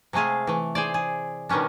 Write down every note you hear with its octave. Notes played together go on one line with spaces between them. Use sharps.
C3 G#3 A3 G#4 F5
E3 A3
G#4 C5 D5
G#4
B2 D#3 G3 C#4 D4